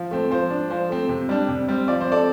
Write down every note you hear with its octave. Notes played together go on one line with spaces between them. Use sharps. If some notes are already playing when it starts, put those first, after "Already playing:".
Already playing: F3
A3 C4
F3 C5
D4
F3 C5
A3 C4
C3
G3 D4
C3
G3 C4
F3 D5
C5
C4 A4 D5